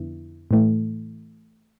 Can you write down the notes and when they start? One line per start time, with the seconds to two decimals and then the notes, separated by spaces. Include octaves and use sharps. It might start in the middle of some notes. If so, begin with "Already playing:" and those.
Already playing: F2 D3 B3 E4
0.51 A2 E3 A3